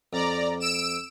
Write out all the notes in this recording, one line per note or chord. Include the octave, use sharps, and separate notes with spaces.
F2 D5 A#5
E6 D7 E7